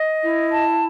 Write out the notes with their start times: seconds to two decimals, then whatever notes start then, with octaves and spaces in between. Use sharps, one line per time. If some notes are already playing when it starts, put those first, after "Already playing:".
Already playing: D#5
0.22 E4
0.52 A5